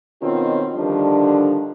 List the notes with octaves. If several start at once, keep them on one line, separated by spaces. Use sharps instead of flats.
B2 D#3 C4 C#4 F4 F#4
D3 D#3 F3 G3 D4